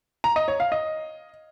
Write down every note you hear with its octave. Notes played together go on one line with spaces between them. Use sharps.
A#5
D#5
C#5
F5
D#5